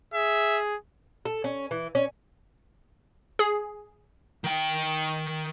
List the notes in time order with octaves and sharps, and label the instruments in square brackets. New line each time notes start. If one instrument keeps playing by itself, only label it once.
[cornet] G#4 [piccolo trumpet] E5
[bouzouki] A4
C#4
E3
C#4
[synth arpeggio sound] G#4
[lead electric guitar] D#3 G5